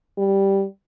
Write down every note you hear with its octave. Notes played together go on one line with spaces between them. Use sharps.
G3